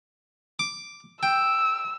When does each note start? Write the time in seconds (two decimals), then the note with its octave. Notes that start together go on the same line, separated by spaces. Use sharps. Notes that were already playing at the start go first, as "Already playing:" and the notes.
0.59 D6
1.23 G5 E6